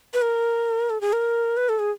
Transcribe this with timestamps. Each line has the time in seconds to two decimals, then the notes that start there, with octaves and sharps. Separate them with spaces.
0.14 B4
0.22 A#4
0.90 A4
1.01 G#4
1.13 A#4
1.57 B4
1.69 A4
1.79 G#4